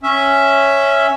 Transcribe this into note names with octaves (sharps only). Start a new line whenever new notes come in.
C#4 E5